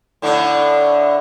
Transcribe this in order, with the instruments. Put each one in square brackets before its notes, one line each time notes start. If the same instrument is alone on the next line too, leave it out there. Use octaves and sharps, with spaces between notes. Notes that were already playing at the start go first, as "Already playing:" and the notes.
[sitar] A2 D3 D4